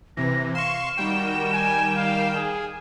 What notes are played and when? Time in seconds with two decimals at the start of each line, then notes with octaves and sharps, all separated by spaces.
0.17 C3 E3 A#6
0.55 F5 C6 C#6 E7
0.98 D#3 G3 F#4 G5
1.53 G#5
1.96 F5
2.35 G#4